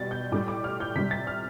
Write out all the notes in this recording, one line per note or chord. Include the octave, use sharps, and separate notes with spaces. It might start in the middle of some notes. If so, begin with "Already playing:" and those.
Already playing: B2 G3 A6
G6
A2 G3 D6
D6
F6
G6
C3 G3 B6
A6
F6